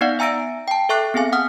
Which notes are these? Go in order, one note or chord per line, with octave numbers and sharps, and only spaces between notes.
B3 D#4 D5 F5 F#5
E5 G#5 A#5 E6 A#6 D7
G5 A5
A4 E5 C#6 F#6 C7
B3 C4 G#4 F5 G#5
F#5 D#6 F6